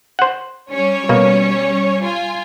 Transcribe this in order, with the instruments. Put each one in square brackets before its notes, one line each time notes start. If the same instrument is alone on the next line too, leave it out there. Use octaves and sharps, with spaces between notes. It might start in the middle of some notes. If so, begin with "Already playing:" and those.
[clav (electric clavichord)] C5 F#5
[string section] G3 C#4 C#5
[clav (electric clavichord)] B2 A#3
[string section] F4 G#5